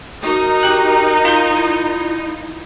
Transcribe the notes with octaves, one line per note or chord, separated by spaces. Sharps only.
D#4 F#4 A#4 A#5
G4 G5 F#6
F4 G6
E4